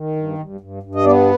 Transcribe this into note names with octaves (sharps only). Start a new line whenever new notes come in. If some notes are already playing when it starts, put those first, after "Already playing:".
Already playing: D#3
G2
G2
G2
G2
D#5
B3 D5